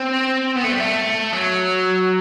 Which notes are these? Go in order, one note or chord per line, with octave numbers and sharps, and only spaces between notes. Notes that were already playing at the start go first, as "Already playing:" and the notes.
Already playing: C4
B3
A3
G3
A3
F#3